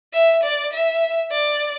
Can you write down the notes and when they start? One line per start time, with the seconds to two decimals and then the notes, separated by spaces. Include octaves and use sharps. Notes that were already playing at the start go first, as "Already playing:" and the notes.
0.13 E5
0.43 D5
0.72 E5
1.31 D5